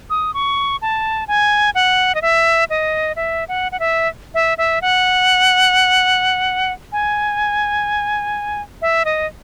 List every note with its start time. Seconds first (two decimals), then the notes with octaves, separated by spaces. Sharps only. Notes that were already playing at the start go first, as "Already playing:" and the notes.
0.10 D#6
0.34 C#6
0.82 A5
1.28 G#5
1.75 F#5
2.15 D#5
2.22 E5
2.70 D#5
3.16 E5
3.48 F#5
3.72 F#5
3.80 E5
4.34 E5
4.58 E5
4.82 F#5
6.92 G#5
8.82 E5
9.05 D#5